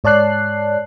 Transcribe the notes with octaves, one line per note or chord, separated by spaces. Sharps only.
G#2 C#5 D5 A5 F#6 C7